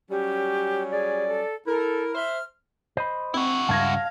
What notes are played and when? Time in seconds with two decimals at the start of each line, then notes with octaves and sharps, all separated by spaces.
0.10 F#3 G3 C#4 G4
0.93 G#4 D5
1.28 A4
1.67 E4 A4 A#4
2.15 C5 E5 F6
2.97 C5 D#5 B5
3.34 C4 E4 F#4
3.69 C#2 G2 F5 F#5 A5 G#6 A#6